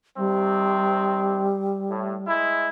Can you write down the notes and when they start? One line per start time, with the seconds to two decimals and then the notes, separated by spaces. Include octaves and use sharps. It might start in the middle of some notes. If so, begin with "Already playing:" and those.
0.17 C3 D#3 G3 C4
1.90 A2
2.27 G#3 E4